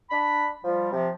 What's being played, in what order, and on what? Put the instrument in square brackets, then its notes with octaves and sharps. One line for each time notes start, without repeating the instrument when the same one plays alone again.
[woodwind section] D4 B5
F3 G3
C3 F3